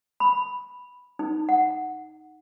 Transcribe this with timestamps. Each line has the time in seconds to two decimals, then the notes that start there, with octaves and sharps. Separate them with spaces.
0.20 B5
1.19 D#4
1.49 F#5